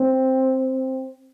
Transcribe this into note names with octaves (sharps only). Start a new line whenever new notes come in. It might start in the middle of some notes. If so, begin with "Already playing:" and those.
Already playing: C4